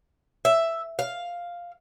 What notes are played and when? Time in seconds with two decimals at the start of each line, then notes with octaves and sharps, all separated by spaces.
0.45 E5
0.99 F5